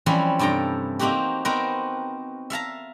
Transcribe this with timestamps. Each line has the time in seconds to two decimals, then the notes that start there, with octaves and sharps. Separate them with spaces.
0.06 E3 F3 G3 C4 C#4 E4
0.39 G2 C3 A4 G5 A#5
0.99 A#3 C4 D#4 F#4 G4
1.45 B3 C4 D#4 F#4 A#4
2.50 E5 F5 A5 A#5